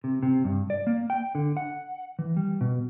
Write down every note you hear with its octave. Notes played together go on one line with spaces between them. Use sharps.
C3
C3
G2
D5
A#3
G5
D3
F#5
E3
G3
B2